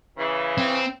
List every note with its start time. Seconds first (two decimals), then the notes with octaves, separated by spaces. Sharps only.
0.18 C#3 E3
0.58 C4